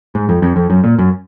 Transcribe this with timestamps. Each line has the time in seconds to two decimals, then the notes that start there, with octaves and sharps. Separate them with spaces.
0.15 G#2
0.29 F2
0.42 F2
0.56 F2
0.70 F#2
0.84 A#2
0.99 F#2